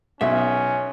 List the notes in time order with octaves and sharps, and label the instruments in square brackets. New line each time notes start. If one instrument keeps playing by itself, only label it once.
[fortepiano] B1 [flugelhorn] C#4 [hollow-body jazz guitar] E5